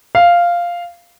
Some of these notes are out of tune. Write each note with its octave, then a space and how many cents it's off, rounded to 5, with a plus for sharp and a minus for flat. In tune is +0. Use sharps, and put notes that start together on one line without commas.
F5 -5